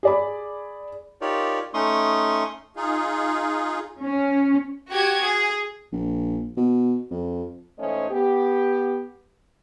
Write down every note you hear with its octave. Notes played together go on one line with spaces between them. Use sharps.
G#4 D5 B5
D#4 F4 G4 A#4 C#5 D5
A3 C#4 D#4 C6 C#6 D#6
D#4 F4 G#4
C#4
F#4 G4 G#6
G#4
A#1
B2
F2
G#2 E3 A3 C#4 C5 D#5
B3 G4